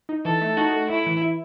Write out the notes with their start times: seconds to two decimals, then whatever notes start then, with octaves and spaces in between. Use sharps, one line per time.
0.09 D#4
0.25 E3 A4
0.41 A3
0.57 D#4 F#4
0.73 A3
0.89 A2 E4
1.06 E3
1.22 E4